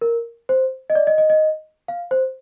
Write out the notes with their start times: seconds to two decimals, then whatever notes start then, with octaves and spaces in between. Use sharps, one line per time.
0.01 A#4
0.49 C5
0.90 D#5
0.95 D5
1.07 D#5
1.18 D#5
1.30 D#5
1.88 F5
2.11 C5